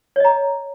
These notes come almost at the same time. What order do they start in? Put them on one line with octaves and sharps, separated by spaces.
C#5 D#5 A#5